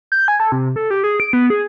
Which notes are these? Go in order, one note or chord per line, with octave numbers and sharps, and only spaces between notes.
G6
G#5
A4
C3
A4
G4
G#4
D7
B3
G#4